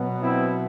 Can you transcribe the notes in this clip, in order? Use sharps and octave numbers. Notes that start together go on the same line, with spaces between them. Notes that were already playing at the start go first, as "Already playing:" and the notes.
Already playing: B2 F#3 B3
C4 E4